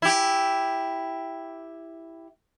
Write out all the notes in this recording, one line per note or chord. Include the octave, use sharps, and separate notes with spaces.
E4 G4